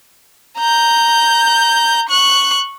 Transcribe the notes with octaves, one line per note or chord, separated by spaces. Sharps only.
A#5 G6
C#6 F#6